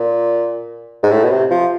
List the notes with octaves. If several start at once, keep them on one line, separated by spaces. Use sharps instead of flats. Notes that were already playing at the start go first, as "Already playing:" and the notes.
Already playing: A#2
G#2
A2
B2
C3
F3